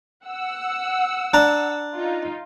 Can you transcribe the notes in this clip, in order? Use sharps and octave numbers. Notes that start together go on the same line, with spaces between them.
F#5 E6
D4 A#5
D#4 F4